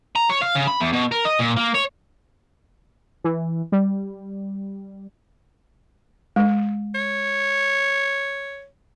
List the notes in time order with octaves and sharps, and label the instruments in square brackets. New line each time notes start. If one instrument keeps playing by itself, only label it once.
[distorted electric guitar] A#5
C#5
F5
C#3
B5
E2
B2
A#4
D#5
A#2
A#3
C#5
[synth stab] E3
G3
[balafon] G#3
[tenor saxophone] C#5